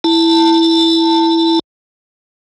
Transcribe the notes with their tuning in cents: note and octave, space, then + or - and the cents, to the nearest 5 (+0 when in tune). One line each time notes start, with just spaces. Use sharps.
E4 +0 A5 +20